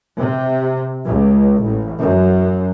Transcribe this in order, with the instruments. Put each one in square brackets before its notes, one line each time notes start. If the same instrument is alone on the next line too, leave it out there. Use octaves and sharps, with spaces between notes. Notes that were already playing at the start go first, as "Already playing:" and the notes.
[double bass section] C3
C#2
A1
F#2